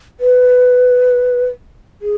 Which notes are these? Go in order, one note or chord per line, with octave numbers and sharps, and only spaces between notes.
B4
G#4